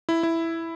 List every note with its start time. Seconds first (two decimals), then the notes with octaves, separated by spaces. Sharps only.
0.09 E4
0.23 E4